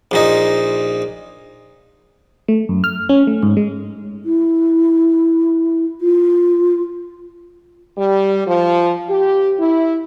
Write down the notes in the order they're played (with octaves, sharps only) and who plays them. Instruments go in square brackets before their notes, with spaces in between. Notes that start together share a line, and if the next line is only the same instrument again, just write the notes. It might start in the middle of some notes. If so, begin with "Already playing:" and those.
[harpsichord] A#1 A#2 D#4
[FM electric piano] A3
F#2
F6
C#4
A3
G#2
G#3
[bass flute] E4
F4
[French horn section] G3
F3
G4
E4